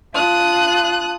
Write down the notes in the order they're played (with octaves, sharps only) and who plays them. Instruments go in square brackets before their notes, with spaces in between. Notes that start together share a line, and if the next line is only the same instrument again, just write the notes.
[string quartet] F4 A5 D#6 F#6